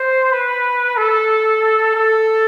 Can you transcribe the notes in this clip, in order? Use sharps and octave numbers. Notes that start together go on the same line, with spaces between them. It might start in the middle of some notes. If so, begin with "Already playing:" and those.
Already playing: C5
B4
A4
A4